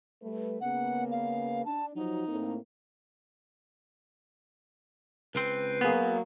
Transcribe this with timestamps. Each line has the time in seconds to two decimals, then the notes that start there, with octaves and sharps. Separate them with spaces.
0.21 G3 A3 B4
0.61 C#3 A#3 B3 F#5
1.11 F5
1.65 D4 A5
1.95 F3 F#3 D#4
2.28 A2 A#3 C4
5.35 C#2 C4 B4
5.81 F#3 A#3 B3 G#4